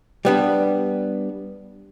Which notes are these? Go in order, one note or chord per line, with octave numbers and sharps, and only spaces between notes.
G3 B3 D4